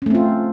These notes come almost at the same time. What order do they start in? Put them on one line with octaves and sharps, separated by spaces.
C#4 A3 C4 F4